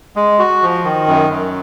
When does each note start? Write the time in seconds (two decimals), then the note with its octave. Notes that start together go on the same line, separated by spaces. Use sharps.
0.16 G#3
0.39 F#4
0.62 F3
0.84 D#3
1.07 F#2
1.30 F#2